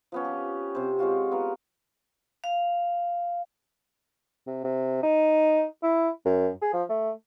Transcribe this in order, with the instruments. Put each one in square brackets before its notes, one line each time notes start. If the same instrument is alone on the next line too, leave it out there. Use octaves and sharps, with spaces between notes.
[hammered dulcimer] F3 B3 C#4
G4
C3 C5
G#3 C#4 F4 F#4
B3 F4 A#4
[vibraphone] F5
[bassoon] C3
C3
D#4
E4
F#2
G#4
F3
A3